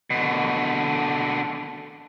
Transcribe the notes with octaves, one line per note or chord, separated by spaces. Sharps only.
B2 D3